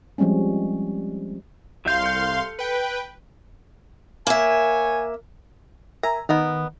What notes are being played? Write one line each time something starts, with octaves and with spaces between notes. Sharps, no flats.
F3 G3 G#3 C4 C#4
C2 F#3 E5 F5 C6 G6
A4 G6
B4 G5
A#3 C#5 E5 G#5
A#4 E5 G#5 A#5
D#3 B3 D#4 A#4